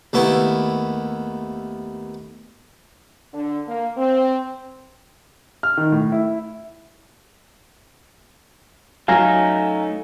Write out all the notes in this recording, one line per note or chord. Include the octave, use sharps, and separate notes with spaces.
D#2 A3 B3 E4
D3
A#3
C4
F6
D#3
A2
E4
F#3 A3 C#4 D#4 F5 G#5 A#5